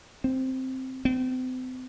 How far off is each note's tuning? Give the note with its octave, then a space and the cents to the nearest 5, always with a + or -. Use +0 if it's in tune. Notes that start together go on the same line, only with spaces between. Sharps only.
C4 +0
C4 -40